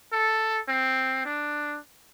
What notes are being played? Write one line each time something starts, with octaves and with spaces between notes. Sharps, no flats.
A4
C4
D4